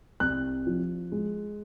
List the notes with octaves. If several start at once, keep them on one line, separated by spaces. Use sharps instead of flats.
C2 F#6
F3
G#3